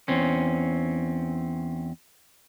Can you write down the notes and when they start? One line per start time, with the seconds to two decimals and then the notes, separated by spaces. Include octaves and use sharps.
0.08 E2 C4 C#4